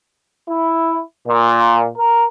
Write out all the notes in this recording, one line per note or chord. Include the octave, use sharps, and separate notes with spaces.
E4
A#2
A#4